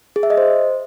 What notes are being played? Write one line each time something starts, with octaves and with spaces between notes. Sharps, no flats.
G#4
E5
D#5
C5